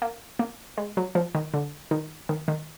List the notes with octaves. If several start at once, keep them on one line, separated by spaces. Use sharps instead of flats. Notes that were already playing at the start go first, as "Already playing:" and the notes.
A#3
A#3
G#3
F#3
F3
D#3
D3
D#3
D#3
D#3